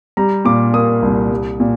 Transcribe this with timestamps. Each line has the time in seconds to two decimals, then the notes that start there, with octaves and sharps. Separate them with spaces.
0.17 G3 A#5
0.45 A#2 D6
0.74 A#3 D#6
1.02 C2
1.31 G3
1.60 A#2